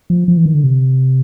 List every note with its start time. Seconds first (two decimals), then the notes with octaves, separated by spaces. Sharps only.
0.10 F3
0.28 F3
0.37 E3
0.46 D#3
0.55 D3
0.64 C3